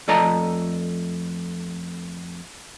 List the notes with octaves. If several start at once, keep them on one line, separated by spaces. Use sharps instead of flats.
F2 A3 D5 D#5 A5 A#5